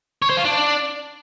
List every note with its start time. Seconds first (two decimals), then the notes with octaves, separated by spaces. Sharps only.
0.22 C#5
0.30 C5
0.37 F4
0.45 D4